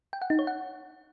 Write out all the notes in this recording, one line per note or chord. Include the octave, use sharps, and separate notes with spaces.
G5
F#5
D#4
C#5
F#5